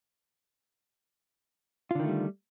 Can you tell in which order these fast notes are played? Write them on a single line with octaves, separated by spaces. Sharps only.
F4 D3 D#3 A3 G3